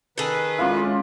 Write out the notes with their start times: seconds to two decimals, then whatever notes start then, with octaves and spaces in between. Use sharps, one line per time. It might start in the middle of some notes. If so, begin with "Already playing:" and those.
0.18 D#3 G#4 A4 B4
0.58 G#3 C#4 E4 F4 D5